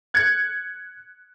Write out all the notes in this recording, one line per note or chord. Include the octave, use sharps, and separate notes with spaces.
F#6 G#6 C#7